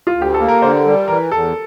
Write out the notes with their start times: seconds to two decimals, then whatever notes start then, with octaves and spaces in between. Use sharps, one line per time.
0.07 F4
0.15 D2
0.22 G4
0.34 A4
0.39 A#3
0.48 A#4
0.62 D3 C5
0.86 G3
1.08 E3 A#4
1.31 E2 A4